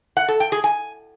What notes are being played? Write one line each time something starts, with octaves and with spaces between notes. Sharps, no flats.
F#5
A4
G5
G#4
G#5